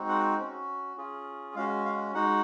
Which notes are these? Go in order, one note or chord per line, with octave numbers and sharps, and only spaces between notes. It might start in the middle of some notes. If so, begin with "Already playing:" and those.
Already playing: G#3 C4 D#4 F#4
F#5
C#4 F#4
C#4 F4 G#4
G#3 C#4 F#4 F5
F5
G#3 D#4 F#4 F#5